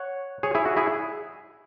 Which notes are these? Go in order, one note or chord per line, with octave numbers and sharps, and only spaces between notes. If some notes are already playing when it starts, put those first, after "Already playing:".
Already playing: C#5 F#5
G#4 C#5
E4 G#4
F#4
E4 G#4